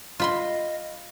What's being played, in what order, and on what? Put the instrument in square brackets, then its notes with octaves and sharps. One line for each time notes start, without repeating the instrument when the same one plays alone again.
[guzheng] F4 B5 C6 [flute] D#5